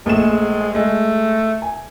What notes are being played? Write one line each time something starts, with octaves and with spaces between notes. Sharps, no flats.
A#1 G#3 A3 E7
G#3 A3
G#5